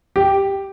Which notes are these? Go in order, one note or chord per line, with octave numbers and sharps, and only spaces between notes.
G4